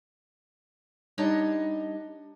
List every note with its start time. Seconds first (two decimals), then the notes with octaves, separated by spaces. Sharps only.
1.18 G3 D4 D#4 C#5 D#5